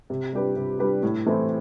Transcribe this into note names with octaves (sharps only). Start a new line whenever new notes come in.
C3
G3 D4 G4 B4
C3
G3 D4 G4 B4
A2
E3 A3 C4 E4